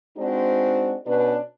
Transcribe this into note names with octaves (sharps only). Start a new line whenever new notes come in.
G#3 C4 D4 D#4 F#4
B2 C#4 D4 B4